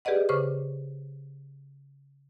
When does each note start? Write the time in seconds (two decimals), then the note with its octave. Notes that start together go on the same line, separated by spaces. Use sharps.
0.05 G4 G#4 B4 D5 D#5 F#5
0.29 C#3 B4 C5 C#6 D6